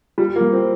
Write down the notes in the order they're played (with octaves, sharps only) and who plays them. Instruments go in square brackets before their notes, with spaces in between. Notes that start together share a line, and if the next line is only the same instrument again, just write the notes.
[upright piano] G3 [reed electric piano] F4
[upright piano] A#3
[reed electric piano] G3
[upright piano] C4